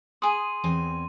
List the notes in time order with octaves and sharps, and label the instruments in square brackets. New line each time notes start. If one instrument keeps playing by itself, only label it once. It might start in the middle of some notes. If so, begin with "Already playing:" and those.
[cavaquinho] G#4 D#6 [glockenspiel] C6 D#7
[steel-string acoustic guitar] E2 C4 G#5